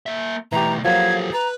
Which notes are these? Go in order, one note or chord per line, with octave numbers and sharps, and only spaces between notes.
A#3 E5
B2 E3 A3 G4 A#5
F3 F#3 A#3 G4 A4 F5 G#6
B4 A#5